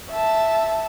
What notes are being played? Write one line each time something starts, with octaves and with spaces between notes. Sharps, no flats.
E5 A5